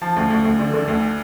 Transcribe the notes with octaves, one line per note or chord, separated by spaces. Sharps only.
F3 A5
D2
D2
D2
D3
D3
D2